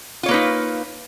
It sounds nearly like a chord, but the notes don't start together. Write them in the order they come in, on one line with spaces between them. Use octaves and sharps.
F4 C#5 A#3 B4 D#4